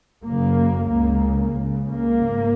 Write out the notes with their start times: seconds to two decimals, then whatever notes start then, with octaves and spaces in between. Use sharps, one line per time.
0.25 F#1 F#2 C#3 A#3
0.91 C#2 C#3 A#3
1.58 C#2 C#3
1.91 A#3
2.24 G#1